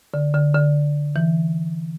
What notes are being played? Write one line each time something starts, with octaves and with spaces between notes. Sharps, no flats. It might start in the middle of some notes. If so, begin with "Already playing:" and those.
D3
D3
D3
E3